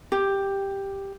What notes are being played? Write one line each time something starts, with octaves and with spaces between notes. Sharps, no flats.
G4